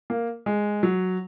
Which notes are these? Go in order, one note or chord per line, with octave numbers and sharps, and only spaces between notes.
A#3
G#3
F#3